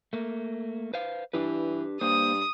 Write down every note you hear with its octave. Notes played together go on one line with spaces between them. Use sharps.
A3 A#3
B4 C5 F5
E3 D4 G4 B4
G2 A#3 C5 D#6